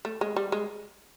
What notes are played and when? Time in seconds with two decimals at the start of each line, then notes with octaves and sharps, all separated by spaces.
0.05 A3
0.21 G#3
0.36 G3
0.52 G#3